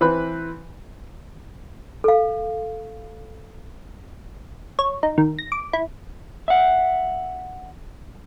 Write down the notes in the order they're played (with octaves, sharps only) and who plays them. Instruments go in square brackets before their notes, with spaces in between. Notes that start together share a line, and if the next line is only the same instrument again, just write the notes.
[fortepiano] E3 C4 B4 B5 F#6
[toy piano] A4 F5
[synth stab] C#5
D#4
D#3
A#6
D6
E4
[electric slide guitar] E5 F#5